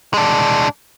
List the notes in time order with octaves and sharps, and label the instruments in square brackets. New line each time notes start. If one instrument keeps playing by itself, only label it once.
[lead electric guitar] G#3 D4